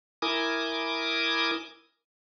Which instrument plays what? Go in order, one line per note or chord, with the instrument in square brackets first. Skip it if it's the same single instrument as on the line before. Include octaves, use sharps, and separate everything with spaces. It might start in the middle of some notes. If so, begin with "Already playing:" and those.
[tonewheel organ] E4 A#4 G#5 D6 D#6